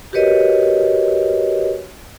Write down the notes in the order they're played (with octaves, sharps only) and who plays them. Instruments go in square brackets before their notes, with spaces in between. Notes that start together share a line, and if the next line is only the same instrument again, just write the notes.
[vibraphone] F#4 G4 A#4 B4 C#5 D#5